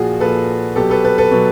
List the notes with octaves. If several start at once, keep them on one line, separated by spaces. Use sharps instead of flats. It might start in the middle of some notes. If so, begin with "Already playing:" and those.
Already playing: A#2 F3 F#4 G#4
A#2 F3 A4 B4
B2 F#3 G4 A4
A4 B4
A4 B4
A4 B4
B2 F#3